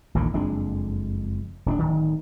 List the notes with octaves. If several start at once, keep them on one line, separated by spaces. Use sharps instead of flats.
A1 D#2 A#2 D3
F#1 F2 G#3 D4
D#1 C#4 D4
D1 D#3